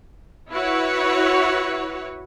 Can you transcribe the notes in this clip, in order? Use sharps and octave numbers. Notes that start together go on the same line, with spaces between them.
E4 F#4 B4 C#5